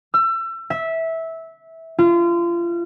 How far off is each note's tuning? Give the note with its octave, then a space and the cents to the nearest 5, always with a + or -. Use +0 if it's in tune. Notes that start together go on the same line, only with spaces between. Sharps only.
E6 +30
E5 -15
F4 -30